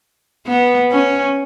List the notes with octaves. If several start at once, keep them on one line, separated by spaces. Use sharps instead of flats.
B3
C#4